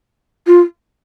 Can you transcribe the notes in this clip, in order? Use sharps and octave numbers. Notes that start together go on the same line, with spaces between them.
F4